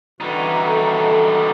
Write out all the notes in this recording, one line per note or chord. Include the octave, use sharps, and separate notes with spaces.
D3 E3 G3 D#4 F#4
A4